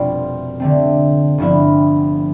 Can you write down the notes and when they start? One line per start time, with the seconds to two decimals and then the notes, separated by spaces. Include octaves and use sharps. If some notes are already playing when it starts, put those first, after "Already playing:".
Already playing: F1 B2 G3 A3 C4 D4 F4
0.60 D3 A3 C4
1.38 G1 G2 F3 B3 E4